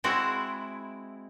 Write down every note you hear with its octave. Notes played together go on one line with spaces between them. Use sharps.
G#3 C4 E4 F#4